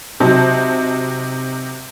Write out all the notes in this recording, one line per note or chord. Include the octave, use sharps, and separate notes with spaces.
C3 F#3 D#4 C5 A5